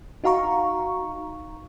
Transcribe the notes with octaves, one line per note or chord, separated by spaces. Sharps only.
D#4 F#4 F5 A#5 C#6